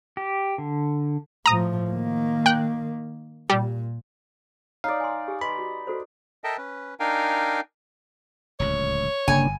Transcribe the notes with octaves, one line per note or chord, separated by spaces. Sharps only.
G4
D3
A2 F3 A#5 D#6
D#3 A#3
G5 F#6
A#2 G3
D#4 C#5 D5 F5
G#5 C6
G4 G#5
B4 D#5 B5 C6
F#4
F#4 A4 C5
A4 A#4 D#5 E5 G5 A5
C#4 B4
D4 D#4 A#4 F5 G5 G#5
D1 C#2 C#5
G1 C#3 A#3 D4 G#5